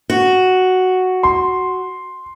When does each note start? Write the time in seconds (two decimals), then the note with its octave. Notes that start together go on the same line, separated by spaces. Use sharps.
0.10 F#4
1.23 C6